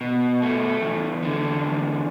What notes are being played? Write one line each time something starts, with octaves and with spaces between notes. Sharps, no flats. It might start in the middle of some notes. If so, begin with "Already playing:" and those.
B2
A3
E2
D3
E2